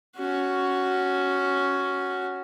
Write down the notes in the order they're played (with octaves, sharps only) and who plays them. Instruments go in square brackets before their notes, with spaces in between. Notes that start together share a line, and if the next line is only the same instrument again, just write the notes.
[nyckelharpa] C#4 F#4